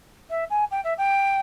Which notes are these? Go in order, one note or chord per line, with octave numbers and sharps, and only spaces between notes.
E5
G#5
G5
E5
G5